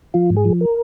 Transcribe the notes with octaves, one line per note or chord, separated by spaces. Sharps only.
F3 F4
G#2
G#4
F3
A#4